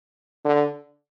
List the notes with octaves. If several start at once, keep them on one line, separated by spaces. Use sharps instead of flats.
D3